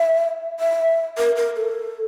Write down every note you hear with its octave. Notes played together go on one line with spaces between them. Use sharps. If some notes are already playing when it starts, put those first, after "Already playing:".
Already playing: E5
E5
A#4
A#4
A4